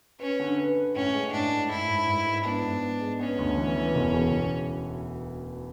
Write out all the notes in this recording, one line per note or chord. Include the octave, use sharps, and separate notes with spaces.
C#4 B4
D3
B4
B4
A2 C#4
G#3
A2 D4
A2
G#2 E4
G#2
G#2
G#2
B3 D4
G#2
B3
G#3
B3 C#4
D2
E3
E3
E1
C#3
E1